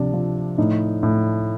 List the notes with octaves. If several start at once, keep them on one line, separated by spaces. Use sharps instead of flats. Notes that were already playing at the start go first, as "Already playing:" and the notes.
Already playing: C3 F3 D4 D5
F3
A2 D#4
A2